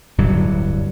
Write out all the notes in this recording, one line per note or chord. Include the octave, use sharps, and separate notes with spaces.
D1 G2 D3 F#3